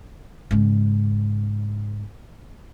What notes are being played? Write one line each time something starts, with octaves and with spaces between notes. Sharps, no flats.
G#2 C#3